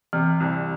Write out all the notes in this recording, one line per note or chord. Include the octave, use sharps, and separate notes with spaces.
C3 E3
C2